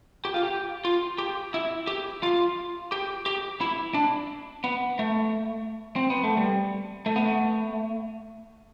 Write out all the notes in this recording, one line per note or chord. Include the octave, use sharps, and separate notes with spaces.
G4
F4
G4
F4
G4
E4
G4
F4
G4
G4
E4
D4
B3
A3
C4
B3
A3
G3
A3
B3
A3